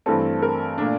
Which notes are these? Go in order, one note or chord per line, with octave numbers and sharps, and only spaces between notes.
G2 E3 A3 C4 A4
A#4
A#2 A3 D4